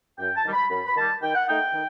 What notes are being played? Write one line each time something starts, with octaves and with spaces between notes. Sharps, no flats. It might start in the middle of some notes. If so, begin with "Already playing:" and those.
F#2 G5
A5
D#3 G3
B5
F#2 B5
B5
D#3 G3 A5
D#3 G5
F#5
A3 D#4 G5
D#3